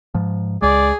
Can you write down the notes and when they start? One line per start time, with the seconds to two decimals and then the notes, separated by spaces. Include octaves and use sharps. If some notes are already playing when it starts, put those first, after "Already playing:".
0.14 G#2 F3
0.62 C#2 G#3 G#4 D5